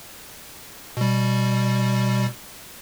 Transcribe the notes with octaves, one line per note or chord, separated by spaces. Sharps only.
B2 G3